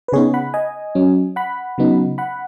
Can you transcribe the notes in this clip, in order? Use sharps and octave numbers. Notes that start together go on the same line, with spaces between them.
B4
C#3 B3 D#4 G#4 C#5
F#5 B5
D#5 G#5
F#3 C#4
F#5 B5
C#3 F#3 B3 D#4
F#5 B5